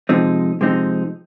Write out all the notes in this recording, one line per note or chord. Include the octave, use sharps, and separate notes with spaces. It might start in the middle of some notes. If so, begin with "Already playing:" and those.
C3 F3 G#3 C4 D#4
C3 F3 G#3 C4 D#4